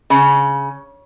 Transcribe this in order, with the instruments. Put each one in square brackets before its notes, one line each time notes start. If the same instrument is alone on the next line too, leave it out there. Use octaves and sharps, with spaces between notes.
[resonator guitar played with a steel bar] C#3